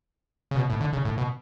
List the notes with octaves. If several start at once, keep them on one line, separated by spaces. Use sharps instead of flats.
C#3
B2
A2
D3
C#3
A2
B2